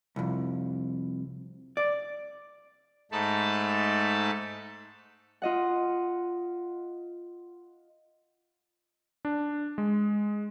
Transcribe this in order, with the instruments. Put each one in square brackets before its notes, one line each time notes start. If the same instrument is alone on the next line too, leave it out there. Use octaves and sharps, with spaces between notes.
[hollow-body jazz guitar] C2 F2
D5
[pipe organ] G#2 A3 D#4 A5 B5
[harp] F4 D#5 F#5
[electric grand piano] D4
G#3